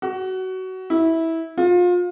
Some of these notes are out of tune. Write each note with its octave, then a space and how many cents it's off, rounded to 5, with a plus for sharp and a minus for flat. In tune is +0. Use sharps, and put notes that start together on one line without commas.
F#4 +20
E4 -15
F4 +30